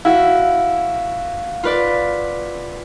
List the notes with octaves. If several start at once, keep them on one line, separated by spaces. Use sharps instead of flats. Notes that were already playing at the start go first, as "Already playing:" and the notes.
E4 F#4 F5
F4 B4 D5